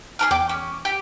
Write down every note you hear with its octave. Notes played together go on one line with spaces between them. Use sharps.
G#4 A#4 F6
E2 G5 D6
C#4
G4 G5